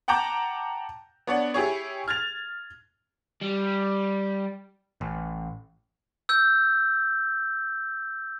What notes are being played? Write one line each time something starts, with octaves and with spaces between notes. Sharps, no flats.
F#5 G5 A5 A#5 D6 G6
B3 D4 C#5 D5 F#5
E4 G4 G#4 C#5
F6 G#6 A6 F7
G3
A1
E6 G6